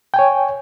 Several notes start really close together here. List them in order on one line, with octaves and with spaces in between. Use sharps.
G5 G#5 C#5